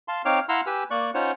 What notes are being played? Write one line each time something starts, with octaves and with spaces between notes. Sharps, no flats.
F5 A5 C6
C4 D#4 C#5 F5 D6 F6
E4 F5 F#5 A#5 C6 E6
G4 B4 G#5 E6
A#3 D5 C#6 F#6
C#4 D#4 F4 C5 C#5 F#5